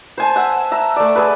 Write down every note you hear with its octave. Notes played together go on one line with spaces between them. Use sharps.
C5 G#5 A5
E5 F#5
E5 A#5
A3 D5
G#4 B4